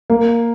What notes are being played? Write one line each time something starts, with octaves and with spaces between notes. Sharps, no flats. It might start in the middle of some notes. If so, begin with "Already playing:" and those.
A#3